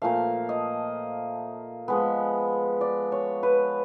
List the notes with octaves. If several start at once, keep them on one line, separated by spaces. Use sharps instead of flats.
A#2 F3 A3 F5
D#5
F3 G#3 B3
D5
C#5
B4